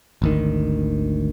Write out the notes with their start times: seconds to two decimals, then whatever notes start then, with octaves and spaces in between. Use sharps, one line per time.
0.22 G#1 D2 D#3